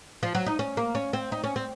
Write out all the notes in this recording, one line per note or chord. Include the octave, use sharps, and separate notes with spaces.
F3
F#3
D#4
C#4
A#3
C#4
C4
D#4
C#4
C4